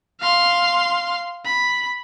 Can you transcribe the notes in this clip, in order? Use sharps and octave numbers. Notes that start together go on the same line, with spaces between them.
F5 C6
B5